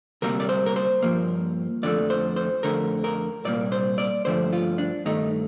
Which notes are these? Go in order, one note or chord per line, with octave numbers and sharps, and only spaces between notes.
D2 C3 G3 A#3 A#4
D5
C5
A#4
C5
G2 F3 A#3
F2 D3 F3 A3 D5
C5
C5
F2 D3 A3 A#4
A#4
C2 A#2 G3 A#3 D5
C5
D5
G2 D3 F3 A3 C5
F4
D4
G2 D#3 A3 D#4